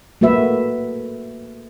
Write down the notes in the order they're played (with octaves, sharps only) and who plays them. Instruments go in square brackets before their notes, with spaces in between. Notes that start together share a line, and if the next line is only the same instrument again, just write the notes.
[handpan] A3 A#3 F#4 B4 E5